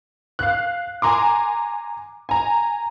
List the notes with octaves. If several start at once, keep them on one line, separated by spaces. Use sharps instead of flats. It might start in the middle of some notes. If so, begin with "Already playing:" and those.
F5 F#6
G#5 A#5 C6 D6
G#5 A#5